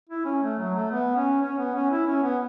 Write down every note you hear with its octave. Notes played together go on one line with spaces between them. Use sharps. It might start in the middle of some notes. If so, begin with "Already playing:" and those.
E4
C#4
A3
F#3
A3
B3
C#4
C#4
B3
C#4
E4
C#4
B3